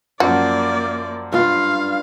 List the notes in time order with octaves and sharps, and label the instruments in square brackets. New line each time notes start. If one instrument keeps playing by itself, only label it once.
[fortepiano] F#2 F3 [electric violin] A#3 D5 [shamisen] F#4
[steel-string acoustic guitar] G2 F4 [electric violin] F5